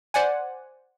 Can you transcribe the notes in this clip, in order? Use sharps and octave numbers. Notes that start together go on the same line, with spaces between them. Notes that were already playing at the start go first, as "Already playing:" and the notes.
C5 D5 F#5 G#5